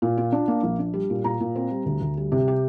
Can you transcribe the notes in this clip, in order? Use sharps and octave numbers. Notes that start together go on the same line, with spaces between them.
A#2
F4
D4
A#3
A#1
D4
G3
A#2
A#2 A#5
A#2
C4
G3
D2
D2
G3
C3
G4